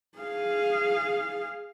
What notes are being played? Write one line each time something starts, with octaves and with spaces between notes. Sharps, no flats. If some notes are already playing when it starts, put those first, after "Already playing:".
G#4 F5